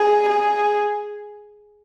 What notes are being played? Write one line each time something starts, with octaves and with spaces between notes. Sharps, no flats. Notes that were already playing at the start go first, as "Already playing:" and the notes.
Already playing: G#4
G#4